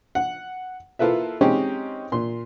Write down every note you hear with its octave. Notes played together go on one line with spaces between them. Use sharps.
F#5
A#3 E4 F4 A4 B4 E5
G#3 C4 C#4 D#4 G4
A#2 C6